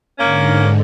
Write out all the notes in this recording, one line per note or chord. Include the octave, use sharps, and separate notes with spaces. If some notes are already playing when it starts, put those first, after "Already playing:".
G#2 D3 A#3 C#4